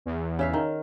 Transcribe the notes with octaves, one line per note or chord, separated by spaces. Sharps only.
E2
C#3 E5 F5
D#3